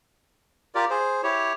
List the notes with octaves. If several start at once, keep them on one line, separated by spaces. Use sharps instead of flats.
F4 G4 A#4 D5
G#4 C5
E4 G4 C#5